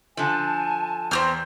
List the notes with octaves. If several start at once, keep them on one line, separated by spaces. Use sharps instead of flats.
D3 F3 G#5 A5
E2 C4 G4 F6 G6